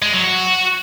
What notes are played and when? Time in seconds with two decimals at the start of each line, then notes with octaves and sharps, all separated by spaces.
0.02 G#3
0.13 F#3
0.24 F#4